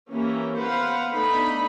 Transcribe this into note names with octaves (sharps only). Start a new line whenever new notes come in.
E3 A#3 C#4 G4
B3 B4 C5 F5 F#5
A3 B3 D4 D#4 D#5 B5